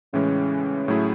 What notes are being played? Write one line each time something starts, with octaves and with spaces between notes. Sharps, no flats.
A2 C#3 E3 G#3 C#4
A2 F#3 A3 E4 G#4